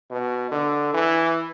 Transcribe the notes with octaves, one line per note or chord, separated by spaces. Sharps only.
B2
D3
E3